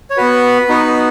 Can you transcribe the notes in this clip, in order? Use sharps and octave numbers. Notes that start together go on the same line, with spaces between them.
C#5
B3 F#4 B4
B3 D#4 F#4